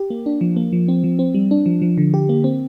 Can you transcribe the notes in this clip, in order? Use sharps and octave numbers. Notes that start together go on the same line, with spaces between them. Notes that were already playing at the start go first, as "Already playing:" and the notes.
Already playing: G4
A#3
D4
F3
A#3
F3
C4
F3
C4
G3
D4
F3
F3
D3
G4
A#3
C4